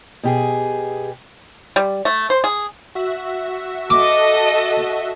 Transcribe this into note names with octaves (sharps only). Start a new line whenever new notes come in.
B2 G4 G#4
G3
A3
C5
G#4
F#4 E5
A4 D#5 D6